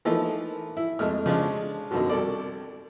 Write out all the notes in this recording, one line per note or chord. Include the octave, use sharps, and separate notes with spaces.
E3 F3 A3 A#3 D#4
E4
F2 G#3 A3 F6
C#3 F3 G#3 D4
F#2 B2 D3 D#3 F3 F#3
C2 A4 D5